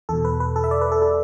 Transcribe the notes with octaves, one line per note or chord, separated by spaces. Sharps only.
E2 B2 A4
B4
B4
A4
E5
D5
B4
A4
A4